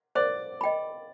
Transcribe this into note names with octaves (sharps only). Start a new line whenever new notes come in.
C5 D5
D#5 G5 B5